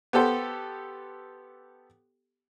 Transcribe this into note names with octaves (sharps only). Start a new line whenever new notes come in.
B3 G4 A4 C5